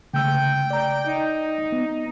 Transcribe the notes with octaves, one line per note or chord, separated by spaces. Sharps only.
C#3 A3 G5 E6
D5 A#5
D#4
B3